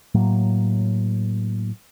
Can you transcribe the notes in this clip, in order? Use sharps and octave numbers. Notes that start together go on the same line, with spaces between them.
A2 F#3 A#3